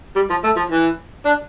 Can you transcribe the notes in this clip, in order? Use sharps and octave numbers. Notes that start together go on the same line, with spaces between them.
G3
F3
A3
F3
E3
D4